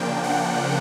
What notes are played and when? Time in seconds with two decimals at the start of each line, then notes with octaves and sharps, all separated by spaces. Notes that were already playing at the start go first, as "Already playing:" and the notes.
Already playing: C#3 F3 A#3 D4 G5
0.24 F#5